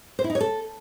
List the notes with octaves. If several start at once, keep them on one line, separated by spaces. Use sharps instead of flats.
C5
E4
D#4
C#5
A4